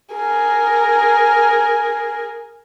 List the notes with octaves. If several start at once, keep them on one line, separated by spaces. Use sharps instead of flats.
G#4 A#4